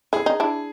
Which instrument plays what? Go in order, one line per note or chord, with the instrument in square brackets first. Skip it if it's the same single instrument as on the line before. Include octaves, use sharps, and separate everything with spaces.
[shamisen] E4 [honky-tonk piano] G#4
[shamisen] D#4
D4 E4